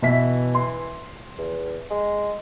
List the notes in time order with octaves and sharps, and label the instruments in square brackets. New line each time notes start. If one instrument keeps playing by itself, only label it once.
[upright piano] B2 E5 B6 [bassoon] E3
[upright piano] C6
[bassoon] E2
G#3